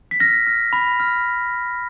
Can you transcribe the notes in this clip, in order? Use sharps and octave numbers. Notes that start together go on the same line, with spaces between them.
B6
F6 A#6
F6
B5
F6